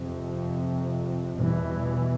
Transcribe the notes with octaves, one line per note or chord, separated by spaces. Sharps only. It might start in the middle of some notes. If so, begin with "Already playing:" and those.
Already playing: F2 C3
E2 B2 E3 G3